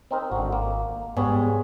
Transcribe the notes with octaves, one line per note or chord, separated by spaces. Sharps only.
C4 D#4 A#4
G#1 D3 F#4
A#3
G#2 G3 B3 G#4 C#5